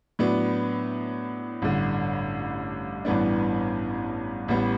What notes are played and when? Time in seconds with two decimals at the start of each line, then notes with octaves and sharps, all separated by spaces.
0.19 A2 F#3 B3 D4
1.62 A1 G2 D3
3.05 A1 G2 E3 B3 D4
4.48 A1 A2 G3 B3